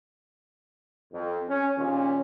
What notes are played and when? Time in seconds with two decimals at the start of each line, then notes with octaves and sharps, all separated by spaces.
1.12 F2
1.48 C#4
1.77 A#1 D#2 A#2 C#4